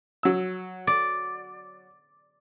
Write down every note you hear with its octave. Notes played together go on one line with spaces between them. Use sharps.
F#3 E6
D5